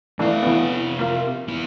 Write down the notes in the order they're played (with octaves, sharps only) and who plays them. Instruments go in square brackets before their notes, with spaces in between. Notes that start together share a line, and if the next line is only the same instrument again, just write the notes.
[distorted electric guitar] C3 F5 [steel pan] E3 A3 D4
[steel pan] E3 B3
A#3 F4
[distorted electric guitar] B3 E4